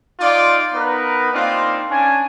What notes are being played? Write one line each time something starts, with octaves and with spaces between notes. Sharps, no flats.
D#4 F4 D5 C6 D6
B3 D#4 A#4 B4
A#3 C4 D4 D#4 F4
C#4 D4 G#5